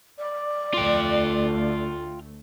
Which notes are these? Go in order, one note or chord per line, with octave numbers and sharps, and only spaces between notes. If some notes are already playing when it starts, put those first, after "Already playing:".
D5
D2 A3 F4 G5